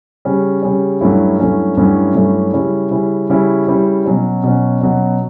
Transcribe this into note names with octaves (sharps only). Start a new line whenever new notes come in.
C#3 G3 C#4
C#3 G3 C#4
G2 F#3 A3 C#4 E4
G2 F#3 A3 C#4 E4
G2 F#3 A3 C#4 E4
G2 F#3 A3 C#4 E4
C#3 G3 C#4 E4
C#3 G3 C#4 E4
C#3 G3 C#4 E4
C#3 G3 C#4 E4
B2 F#3 C#4
B2 F#3 C#4
B2 F#3 C#4